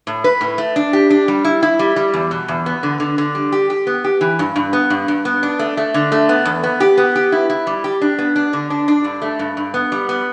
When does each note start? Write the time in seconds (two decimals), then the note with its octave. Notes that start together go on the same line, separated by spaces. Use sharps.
0.07 A2
0.24 B4
0.41 A2
0.58 A3
0.76 D4
0.93 G4
1.10 D4
1.28 G3
1.44 E4
1.63 E4
1.79 G3
1.96 G3
2.14 E2
2.31 B2
2.48 E2
2.66 B3
2.83 D3
3.00 D3
3.18 D3
3.35 G3
3.52 G4
3.70 G4
3.87 B3
4.04 G4
4.21 E3
4.39 G2
4.56 G2
4.73 B3
4.90 G2
5.08 G2
5.25 B3
5.43 D4
5.59 A3
5.77 A3
5.94 D3
6.12 A3
6.29 B3
6.45 E2
6.63 B3
6.80 G4
6.97 B3
7.15 G4
7.32 E4
7.50 E4
7.67 G3
7.84 G4
8.01 D4
8.18 B3
8.36 D4
8.53 D3
8.70 D4
8.88 D4
9.04 G2
9.22 A3
9.39 G2
9.57 G2
9.74 B3
9.92 G3
10.09 B3